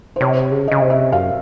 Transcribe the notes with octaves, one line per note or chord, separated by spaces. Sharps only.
C5
C3 C#5
C#3
C#3 D#5
C3
E5
F#2 F5